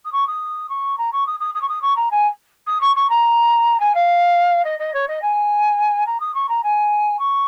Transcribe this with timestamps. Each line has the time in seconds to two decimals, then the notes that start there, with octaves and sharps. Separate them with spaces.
0.05 D#6
0.12 C#6
0.27 D#6
0.69 C#6
0.98 A#5
1.12 C#6
1.26 D#6
1.40 D#6
1.54 D#6
1.61 C#6
1.69 D#6
1.82 C#6
1.96 A#5
2.11 G#5
2.67 D#6
2.81 C#6
2.96 C#6
3.09 A#5
3.80 G#5
3.94 F5
4.64 D#5
4.79 D#5
4.93 C#5
5.08 D#5
5.22 G#5
6.06 A#5
6.20 D#6
6.34 C#6
6.49 A#5
6.63 G#5
7.19 C#6